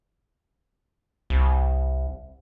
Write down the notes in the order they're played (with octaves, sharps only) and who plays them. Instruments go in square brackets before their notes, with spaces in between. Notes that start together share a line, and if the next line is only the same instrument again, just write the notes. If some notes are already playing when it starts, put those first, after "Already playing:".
[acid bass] C2